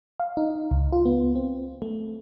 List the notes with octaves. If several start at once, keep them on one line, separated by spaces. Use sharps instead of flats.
F5
D#4
C#2
F4
B3
C4
A3